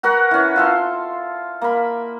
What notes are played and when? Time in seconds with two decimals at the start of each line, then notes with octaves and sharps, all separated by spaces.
0.03 F#4 A#4 B4 F#5
0.31 E3 C#4
0.56 F4 A4 C6
1.61 A#3 B5